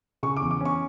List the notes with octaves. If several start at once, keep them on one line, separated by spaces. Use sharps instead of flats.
C#3 C#6
D6
E2
D6
C#4 C#6